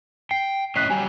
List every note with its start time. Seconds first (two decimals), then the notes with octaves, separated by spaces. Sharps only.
0.31 G5 C7
0.76 A2 C#4 D#5 F#6 B6 C7
0.90 F#3 G3 G#5